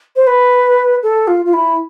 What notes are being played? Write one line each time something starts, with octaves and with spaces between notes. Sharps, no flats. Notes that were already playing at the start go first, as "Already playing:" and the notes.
C5
B4
A4
F4
F4
E4